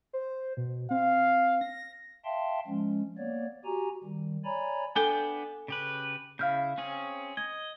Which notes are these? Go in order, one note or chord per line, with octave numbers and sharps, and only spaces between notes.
C5
B2
C4 F5
A#6
E5 F5 G5 A5 C6
F3 G#3 C#4
A#3 B3 C#5 D5
F#4 G4 G#5 A#5
D#3 G3
C#5 D5 G#5 A#5 B5
B3 D4 A4 G5 G#5
C#3 G4 B4
C#3 E4 F5 F6 G6
C4 C#4 G#4
D#5 G#6